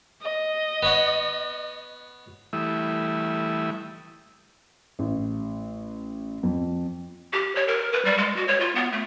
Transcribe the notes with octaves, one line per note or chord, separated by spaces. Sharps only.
D#5
B3 C#5 F#5
E3 G3 A3 E4 E5 D#6
A1
F2
G4
C#5
A#4
B4
G3
G#3
F#4
C#5
F4
B3
A3